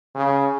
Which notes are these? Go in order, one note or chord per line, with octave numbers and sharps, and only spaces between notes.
C#3